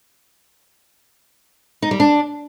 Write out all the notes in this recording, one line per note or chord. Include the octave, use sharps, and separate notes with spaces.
D#4
G3
D4